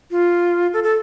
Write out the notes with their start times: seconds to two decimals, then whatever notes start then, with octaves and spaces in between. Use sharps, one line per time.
0.11 F4
0.74 A4
0.84 A4